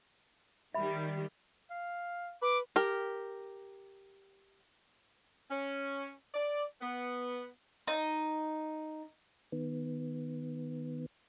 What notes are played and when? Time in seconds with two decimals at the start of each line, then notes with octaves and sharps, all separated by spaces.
0.74 D#3 G3 E5 B5
1.70 F5
2.42 B4 D6
2.76 G4 A#4
5.50 C#4
6.34 D5
6.81 B3
7.88 D#4
9.52 D#3 B3